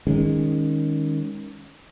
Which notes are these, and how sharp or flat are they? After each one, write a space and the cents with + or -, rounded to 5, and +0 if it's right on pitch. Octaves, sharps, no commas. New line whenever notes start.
D#3 +0 G#3 -20 C#4 +0